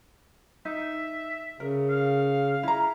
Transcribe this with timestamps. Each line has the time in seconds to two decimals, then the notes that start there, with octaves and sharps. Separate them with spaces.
0.65 D#4 E5
1.60 C#3 A#4
1.90 F5
2.63 E4 A#5